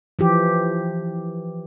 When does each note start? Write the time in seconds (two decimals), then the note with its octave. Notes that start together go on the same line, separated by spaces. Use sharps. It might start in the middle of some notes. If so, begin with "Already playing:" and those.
0.19 E3 F3 G4